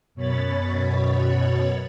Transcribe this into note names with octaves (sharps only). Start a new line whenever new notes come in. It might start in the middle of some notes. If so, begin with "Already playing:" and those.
F#2 B2 C#5 B5 A6